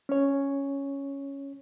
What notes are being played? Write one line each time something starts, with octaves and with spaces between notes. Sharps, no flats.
C#4 C#5